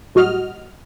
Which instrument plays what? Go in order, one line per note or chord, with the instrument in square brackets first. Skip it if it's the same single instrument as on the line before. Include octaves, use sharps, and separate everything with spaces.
[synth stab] A2 F#3 G3 F#4 D#5 F6